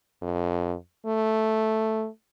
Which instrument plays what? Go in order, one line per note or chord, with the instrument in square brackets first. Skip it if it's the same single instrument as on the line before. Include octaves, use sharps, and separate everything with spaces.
[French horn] F2
A3